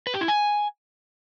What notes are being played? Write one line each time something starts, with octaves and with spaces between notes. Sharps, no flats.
B4
G4
E4
G#5